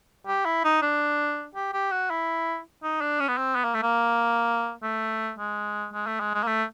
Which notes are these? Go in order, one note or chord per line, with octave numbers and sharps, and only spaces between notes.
G4
E4
D#4
D4
G4
G4
F#4
E4
D#4
D4
C#4
B3
C4
B3
A#3
A3
A#3
A3
G#3
G#3
A3
G#3
G#3
A#3
A3